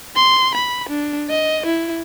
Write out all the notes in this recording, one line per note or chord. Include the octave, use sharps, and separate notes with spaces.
C6
B5
D4
D#5
E4